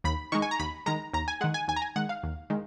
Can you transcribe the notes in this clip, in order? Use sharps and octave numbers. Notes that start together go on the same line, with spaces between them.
D#2 B5
D#3 G#3 C#6
G#5
A#5
D#2 B5
D#3 G#3 A#5
D#2 A#5
G#5
D#3 G#3 F#5
G#5
D#2 G#5
A#5
G#5
D#3 G#3 F#5
F5
D#2
D#3 G#3